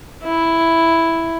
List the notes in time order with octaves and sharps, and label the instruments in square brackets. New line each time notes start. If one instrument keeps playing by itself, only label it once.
[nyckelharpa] E4